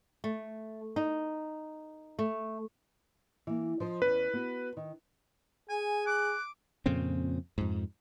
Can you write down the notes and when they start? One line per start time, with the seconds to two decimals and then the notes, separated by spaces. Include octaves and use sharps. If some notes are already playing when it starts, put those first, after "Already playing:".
0.24 A3
0.96 D#4
2.19 A3
3.47 E3 A#3
3.80 F3 C5 D#5
4.02 E2 C#4 B4
4.33 B3 F#4
4.77 D#3
5.69 G#4 G#5
6.07 D6 F#6
6.86 F2 A#2 C#3 C4
7.58 F2 G#2